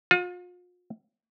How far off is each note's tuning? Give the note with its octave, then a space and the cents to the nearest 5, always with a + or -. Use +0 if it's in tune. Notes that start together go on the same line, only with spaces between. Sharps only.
F4 +40